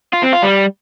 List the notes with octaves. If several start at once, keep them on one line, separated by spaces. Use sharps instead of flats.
F4
C4
F4
G3